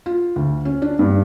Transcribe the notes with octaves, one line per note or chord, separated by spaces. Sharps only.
F4
D2
C#4
D4
G2